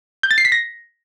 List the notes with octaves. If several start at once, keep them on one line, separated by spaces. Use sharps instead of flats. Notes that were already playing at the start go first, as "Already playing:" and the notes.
G6
A6
C7
B6
A#6